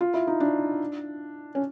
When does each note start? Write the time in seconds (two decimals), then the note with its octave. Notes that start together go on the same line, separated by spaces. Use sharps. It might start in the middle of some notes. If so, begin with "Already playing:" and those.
0.01 F4
0.14 E4
0.27 D#4
0.40 D4
1.55 C#4